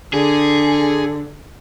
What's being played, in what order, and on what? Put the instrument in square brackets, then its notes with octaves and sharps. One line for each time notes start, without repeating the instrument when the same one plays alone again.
[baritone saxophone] D3 [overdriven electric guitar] G#4